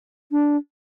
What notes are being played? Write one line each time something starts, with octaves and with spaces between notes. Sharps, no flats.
D4